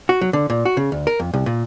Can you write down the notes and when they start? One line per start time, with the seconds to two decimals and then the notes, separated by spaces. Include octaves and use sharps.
0.09 F#4
0.21 F#3
0.33 D3
0.50 A#2
0.65 F#4
0.77 C#3
0.92 D2
1.07 A#4
1.20 F2
1.33 C2
1.46 A#2